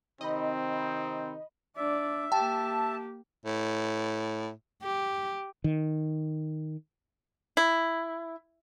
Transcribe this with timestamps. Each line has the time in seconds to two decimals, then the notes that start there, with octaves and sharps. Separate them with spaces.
0.21 C3 D#3 C4 D#4 D#5 B5
1.77 D4 D5 E5
2.32 A#3 G4 G5 A5
3.46 A2
4.83 G4
5.64 D#3
7.57 E4